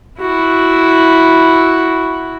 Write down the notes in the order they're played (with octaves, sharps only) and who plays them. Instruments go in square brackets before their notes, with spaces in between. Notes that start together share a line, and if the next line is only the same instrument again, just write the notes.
[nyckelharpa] E4 F#4